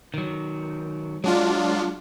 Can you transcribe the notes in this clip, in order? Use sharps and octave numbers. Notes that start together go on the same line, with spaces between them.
D#3 F#3
F#3 G#3 D4 F4